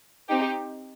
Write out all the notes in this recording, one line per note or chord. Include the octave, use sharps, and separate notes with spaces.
C4 D#4 G4